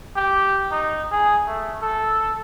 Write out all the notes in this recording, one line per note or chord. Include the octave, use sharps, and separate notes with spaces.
G4
D#4
G#4
A3
A4